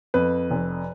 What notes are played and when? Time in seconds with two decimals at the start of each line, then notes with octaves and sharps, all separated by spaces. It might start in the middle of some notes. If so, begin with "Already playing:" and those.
0.14 F2 B4
0.50 F1